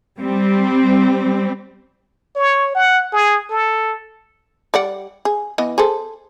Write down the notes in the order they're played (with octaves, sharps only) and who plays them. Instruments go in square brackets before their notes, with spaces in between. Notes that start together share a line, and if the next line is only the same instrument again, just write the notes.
[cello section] G3 C4
[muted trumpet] C#5
F#5
G#4
A4
[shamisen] G3 D5 F#5
G#4
E3 B3 D#5
G#4 A4 C5